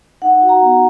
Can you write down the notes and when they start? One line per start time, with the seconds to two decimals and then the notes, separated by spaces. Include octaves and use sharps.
0.22 D#4 F#5
0.42 F#4
0.49 A#5
0.62 B3